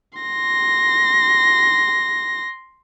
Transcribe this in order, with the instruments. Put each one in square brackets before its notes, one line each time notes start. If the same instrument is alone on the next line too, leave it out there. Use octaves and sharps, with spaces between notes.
[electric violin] C6 A#6